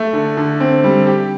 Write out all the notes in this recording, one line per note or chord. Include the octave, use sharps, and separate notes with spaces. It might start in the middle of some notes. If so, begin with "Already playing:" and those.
Already playing: A3
D3
D3
C4
G3
G4